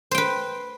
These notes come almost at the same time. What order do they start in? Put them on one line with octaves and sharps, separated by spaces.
C5 G5 B4